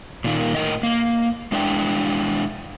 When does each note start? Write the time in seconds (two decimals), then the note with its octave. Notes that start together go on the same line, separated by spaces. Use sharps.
0.24 A#2 D#3 A#3
0.55 A2 A#4 D#5
0.83 A#3
1.52 G#3 D4 E4 G5